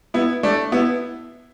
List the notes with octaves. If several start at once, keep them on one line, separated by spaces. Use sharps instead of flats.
B3 E4
A3 D4
B3 E4